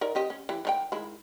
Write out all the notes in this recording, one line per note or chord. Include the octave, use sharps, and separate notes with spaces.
D#4 A#4 D5
C4 G4 D#5
C#4
E3 G4
D#3 D#4 G5
D#3 G#3 E4